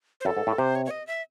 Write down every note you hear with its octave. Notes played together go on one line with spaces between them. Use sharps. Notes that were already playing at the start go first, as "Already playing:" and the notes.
C5
F#2 A4
G#2
A2
C3 C5
C#5
C#5
D#5
E5